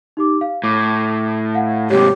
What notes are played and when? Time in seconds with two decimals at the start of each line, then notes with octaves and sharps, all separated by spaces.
0.17 D#4 G4 D6
0.41 F5
0.64 A2 D6
1.54 F5 F#5
1.90 G#2 C3 G4 C#5